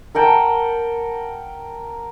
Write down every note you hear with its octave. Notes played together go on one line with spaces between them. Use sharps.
A#4 F#5 G5 A5